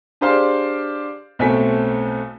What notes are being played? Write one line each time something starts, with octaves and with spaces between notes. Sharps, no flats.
D4 G4 G#4 C5 D5 F5
B1 A2 A3 C4 G#5 B6